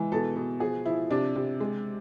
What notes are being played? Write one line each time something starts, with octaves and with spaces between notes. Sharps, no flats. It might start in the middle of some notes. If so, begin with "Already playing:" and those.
Already playing: E3 G#3
B2 A4
B2
F3 G#4
F3 E4
C3 D4
C3
G#3